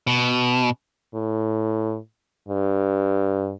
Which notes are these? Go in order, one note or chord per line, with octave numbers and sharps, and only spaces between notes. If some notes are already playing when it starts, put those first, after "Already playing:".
B2
A2
G2